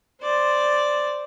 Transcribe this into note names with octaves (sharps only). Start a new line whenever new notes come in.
C5 D5